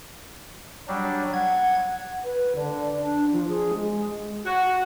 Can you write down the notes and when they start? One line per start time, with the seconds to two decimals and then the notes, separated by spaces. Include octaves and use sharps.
0.88 F#3 G3 D4
1.33 F#5 G#6
2.24 B4
2.55 D3
2.99 D4
3.32 F3
3.48 G#4
3.73 G#3
4.45 F#4